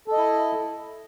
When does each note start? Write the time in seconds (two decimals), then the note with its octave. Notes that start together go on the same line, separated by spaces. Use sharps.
0.08 A4
0.12 D#5
0.17 E4